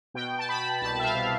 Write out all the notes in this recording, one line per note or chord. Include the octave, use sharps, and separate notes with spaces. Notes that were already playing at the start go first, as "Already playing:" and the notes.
B2 G5
A5
B2 B5
B5
C2 A5
E5
F5
B2